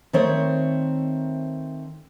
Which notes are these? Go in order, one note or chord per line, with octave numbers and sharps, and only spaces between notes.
D#3 A3 C4 C5 C#5